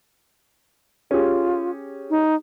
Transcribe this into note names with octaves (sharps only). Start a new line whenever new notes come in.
C#4 F4 G4 G#4
D#4